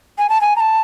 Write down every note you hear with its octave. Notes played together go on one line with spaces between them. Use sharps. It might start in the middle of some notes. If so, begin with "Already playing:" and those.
G#5
A5
G#5
A#5
A5